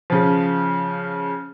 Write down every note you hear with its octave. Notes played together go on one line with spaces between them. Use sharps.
C#3 F3